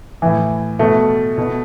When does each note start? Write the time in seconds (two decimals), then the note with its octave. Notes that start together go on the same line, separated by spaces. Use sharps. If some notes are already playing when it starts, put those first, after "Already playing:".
0.22 A2 E3
0.79 B2 A3
1.38 B2